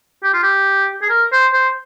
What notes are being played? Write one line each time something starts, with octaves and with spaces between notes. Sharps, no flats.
G4
F4
G4
G#4
A#4
C5
C5